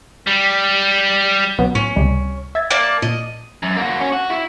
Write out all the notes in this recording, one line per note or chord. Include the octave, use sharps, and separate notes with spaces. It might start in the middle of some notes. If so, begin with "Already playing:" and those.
G3
B1 F#3 B3
A2 C#4
C#2 C3 G3
E5 G#6 A6
A#3 D5 A5
A#2 D#5
F#2
A#3 F#4
C#4
F#4
E4